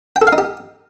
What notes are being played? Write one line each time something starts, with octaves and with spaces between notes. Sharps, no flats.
G5
A4
F5
D#4
G4